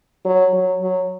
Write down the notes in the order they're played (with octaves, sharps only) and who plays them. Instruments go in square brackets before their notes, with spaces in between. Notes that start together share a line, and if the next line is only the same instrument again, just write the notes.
[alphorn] F#3
F#3
F#3